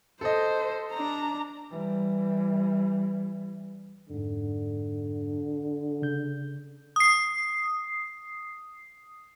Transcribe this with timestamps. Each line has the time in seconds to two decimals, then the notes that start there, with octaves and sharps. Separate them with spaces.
0.21 A4 C5 D#5
0.92 D4 A#5
1.71 E3 G3
4.09 F2 G#2 D3
6.02 C#3 G6
6.96 D#6 C7